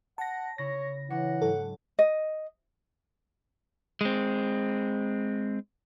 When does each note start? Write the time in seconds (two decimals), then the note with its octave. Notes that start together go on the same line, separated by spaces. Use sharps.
0.18 F#5 A5 A#6
0.58 C#3 E4 C#5 A#6
1.10 E3 D4 C#5 F#5 C#7
1.42 G#2 F#3 G#3 A4
1.99 D#5
4.01 G#3 C4